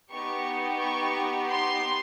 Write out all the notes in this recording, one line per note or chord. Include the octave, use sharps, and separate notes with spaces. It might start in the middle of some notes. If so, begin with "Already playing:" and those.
B3 D#4 G4 C#6
C#6
C6